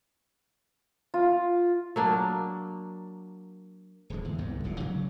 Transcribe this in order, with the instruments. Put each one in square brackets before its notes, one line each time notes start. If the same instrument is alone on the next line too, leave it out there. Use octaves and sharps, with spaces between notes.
[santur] F4
[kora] F#3 A#3 D4
[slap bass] D1 D3 G#3
E2
G1 C2 G#2
D#1 A#1 A#2
C#3 F#3 G3